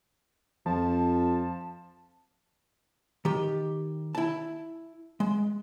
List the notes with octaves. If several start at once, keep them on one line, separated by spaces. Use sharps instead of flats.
F2 F3 A5
D#3 G4
E4 A5
G#3